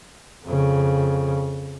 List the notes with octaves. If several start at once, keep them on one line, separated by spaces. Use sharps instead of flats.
F2 C#3